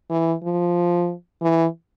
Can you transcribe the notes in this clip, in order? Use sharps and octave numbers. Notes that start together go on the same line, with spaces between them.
E3
F3
E3